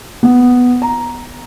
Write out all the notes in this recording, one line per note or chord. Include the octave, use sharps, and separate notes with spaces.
B3
A#5